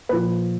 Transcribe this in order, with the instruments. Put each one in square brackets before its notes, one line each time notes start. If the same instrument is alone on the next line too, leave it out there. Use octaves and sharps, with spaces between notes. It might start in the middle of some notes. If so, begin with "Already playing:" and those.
[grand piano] A#2 F3 B4